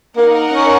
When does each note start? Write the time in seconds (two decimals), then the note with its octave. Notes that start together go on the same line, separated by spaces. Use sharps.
0.17 A#3 D#4 A#4 F#5
0.52 C#4